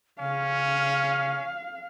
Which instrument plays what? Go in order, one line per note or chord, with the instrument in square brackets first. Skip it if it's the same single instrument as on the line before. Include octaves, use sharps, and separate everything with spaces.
[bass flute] C#3 [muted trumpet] C#4 [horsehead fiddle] F5